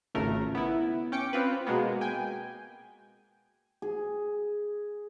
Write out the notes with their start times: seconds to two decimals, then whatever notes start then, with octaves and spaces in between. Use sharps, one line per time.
0.15 G#1 C#2 C#3 A3 A#4
0.55 B3 E4
1.12 C#4 G5 D6 C#7
1.33 C4 F4 B4
1.67 B2 G#3 A#3 B3
2.01 G5 G#5
3.82 G#4